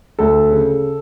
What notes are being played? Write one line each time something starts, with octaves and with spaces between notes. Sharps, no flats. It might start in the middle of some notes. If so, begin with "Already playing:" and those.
D2 A4
C#3